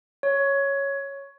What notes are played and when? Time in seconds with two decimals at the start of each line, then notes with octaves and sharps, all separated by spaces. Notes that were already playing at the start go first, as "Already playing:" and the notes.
0.23 C#5